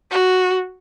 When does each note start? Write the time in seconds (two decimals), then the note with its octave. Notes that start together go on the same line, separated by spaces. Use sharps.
0.11 F#4